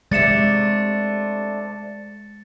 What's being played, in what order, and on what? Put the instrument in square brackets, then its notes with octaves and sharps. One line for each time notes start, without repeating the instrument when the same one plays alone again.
[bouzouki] C3 A3 D4 [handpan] G#3 [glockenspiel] A6 C#7 E7